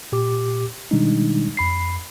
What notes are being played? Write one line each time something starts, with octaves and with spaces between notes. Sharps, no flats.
A#2 G4 D6
B2 D#3 G3 G#3 D4 D#4
F2 B5 C7